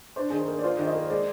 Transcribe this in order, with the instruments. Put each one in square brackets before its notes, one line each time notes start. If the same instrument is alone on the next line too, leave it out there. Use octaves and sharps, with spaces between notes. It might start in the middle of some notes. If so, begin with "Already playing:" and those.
[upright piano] D4 [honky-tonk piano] C5
[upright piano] D#3 [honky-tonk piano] G#4
[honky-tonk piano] A#4
[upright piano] A#3
[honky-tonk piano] D5
[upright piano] F4 [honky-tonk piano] C5
[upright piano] D#3
[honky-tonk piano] D#5
[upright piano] A#3
[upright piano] G#3 [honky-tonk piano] D5